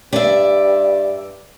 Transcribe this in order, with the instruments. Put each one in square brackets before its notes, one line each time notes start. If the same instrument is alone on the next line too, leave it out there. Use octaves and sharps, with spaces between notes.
[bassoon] G2 [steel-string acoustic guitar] D5 E5